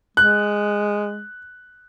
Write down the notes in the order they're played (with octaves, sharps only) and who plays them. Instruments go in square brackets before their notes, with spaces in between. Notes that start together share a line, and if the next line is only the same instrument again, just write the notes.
[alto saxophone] G#3 [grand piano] F#6